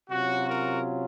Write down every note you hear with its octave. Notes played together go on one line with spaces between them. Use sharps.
C3 F#3 C#4 F4 F#4
F#4 A#4